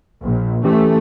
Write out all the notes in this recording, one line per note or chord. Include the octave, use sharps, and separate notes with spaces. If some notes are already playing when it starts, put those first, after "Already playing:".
A#1
E3 A3 C#4 G4